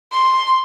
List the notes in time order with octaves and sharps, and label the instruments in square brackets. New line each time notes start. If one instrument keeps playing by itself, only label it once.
[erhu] C6